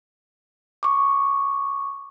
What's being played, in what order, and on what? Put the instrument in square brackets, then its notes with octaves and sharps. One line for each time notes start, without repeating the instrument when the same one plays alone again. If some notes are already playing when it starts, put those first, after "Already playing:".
[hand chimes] C#6 D6